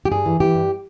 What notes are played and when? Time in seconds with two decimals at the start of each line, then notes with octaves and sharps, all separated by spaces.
0.05 G4
0.11 G2 G#4
0.26 E3
0.40 E3 G4
0.55 G2